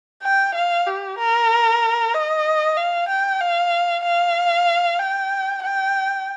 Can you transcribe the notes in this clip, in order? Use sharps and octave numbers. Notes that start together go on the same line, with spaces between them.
G5
F5
G4
A#4
D#5
F5
G5
F5
F5
G5
G5